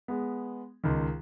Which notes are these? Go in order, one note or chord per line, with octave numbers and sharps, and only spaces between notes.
G#3 B3
C#2 D#3